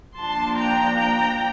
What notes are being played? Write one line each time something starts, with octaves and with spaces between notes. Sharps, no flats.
F3 A#3 D4 A5 C6
G5 A#5
G5 A#5